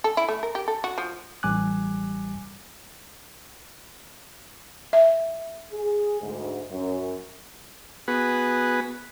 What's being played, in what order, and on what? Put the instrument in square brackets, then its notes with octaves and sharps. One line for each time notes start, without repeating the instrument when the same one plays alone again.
[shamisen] A4
E4
A3
A#4
G4
A4
F#4
F3
[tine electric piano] A1 G3 G#5 D6 F#6
[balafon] E5
[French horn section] G#4
D2 G#2
F#2
[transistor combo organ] B3 F#4 G#4 B4